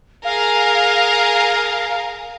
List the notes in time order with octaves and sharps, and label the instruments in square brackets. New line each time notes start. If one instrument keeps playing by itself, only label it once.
[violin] G#4 A#4 [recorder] F5